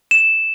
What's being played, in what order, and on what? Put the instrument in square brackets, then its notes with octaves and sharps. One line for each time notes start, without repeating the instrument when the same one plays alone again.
[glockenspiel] E7